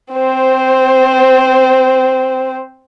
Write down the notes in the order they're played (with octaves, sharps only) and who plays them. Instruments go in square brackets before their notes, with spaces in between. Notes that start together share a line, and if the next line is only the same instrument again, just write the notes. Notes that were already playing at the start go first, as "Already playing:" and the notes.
[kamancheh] C4 C5